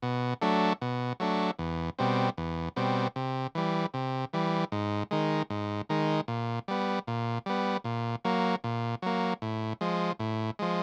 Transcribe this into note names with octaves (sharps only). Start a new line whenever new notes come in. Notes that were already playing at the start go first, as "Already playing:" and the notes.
B2
F#3 A3 D4
B2
F#3 A3 D4
E2
B2 G3 C4
E2
B2 G3 C4
C3
E3 G3
C3
E3 G3
G#2
D#3 G#3
G#2
D#3 G#3
A#2
G3 B3
A#2
G3 B3
A#2
F#3 A#3
A#2
F#3 A#3
A2
F3 G#3
A2
F3 G#3